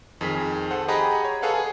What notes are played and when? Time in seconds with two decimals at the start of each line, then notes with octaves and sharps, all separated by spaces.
0.21 F2 D#3 G#4 B6
0.71 A4 C5 F#5
0.88 G4 G#4 D#5 F#5 A#5 B5
1.25 C#5
1.42 G#4 A4 B4 F5 F#5
1.54 G#4